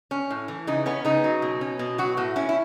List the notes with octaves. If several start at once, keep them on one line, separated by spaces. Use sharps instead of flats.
C#4
A2
E3
C#3 D#4
B3 C#4
C#3 D#4
F#3
B2
C#4
B2
F#3 F#4
A2 F#4
C#4 E4
E4